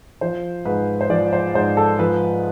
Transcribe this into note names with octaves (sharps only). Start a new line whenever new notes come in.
F3 C5
G#2 B4
C5
F3 D5
C5
G#2 C5
A4
F3 B4